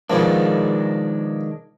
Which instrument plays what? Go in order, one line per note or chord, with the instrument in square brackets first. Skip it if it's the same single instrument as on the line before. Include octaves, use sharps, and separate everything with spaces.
[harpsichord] B2 F3 A#3 [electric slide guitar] D#3 G#3 D4